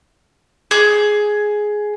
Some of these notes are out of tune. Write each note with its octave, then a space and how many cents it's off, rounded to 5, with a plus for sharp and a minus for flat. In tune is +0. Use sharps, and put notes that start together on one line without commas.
G#4 +10